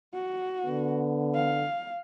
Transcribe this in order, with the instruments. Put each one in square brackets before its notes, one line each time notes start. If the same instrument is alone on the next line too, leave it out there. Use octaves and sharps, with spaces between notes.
[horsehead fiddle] F#4
[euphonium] D3 [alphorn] B3
[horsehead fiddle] F5